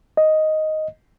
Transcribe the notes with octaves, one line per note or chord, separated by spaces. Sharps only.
D#5